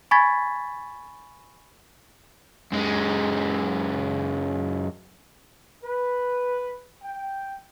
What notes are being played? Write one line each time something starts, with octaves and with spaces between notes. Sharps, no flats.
G#5 B5 C#6 G#6 A6 B6
F#2 G#3
B4
G5